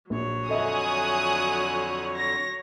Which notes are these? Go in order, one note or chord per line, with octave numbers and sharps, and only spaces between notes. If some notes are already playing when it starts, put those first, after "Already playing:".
A#1 F#3 C#5
F2 D3 A4 D#5 E5 G#5 D#6 F#6
A#6